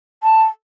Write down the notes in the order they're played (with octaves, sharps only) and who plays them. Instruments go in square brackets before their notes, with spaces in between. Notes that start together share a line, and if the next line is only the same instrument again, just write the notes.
[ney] A5